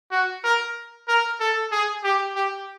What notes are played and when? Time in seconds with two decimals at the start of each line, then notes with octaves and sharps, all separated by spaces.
0.12 F#4
0.44 A#4
1.09 A#4
1.40 A4
1.72 G#4
2.04 G4
2.36 G4